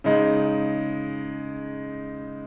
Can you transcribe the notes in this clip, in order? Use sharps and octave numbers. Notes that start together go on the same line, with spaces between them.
C#3 G#3 D#4